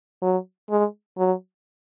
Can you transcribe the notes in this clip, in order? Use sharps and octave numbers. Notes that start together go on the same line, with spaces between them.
F#3
G#3
F#3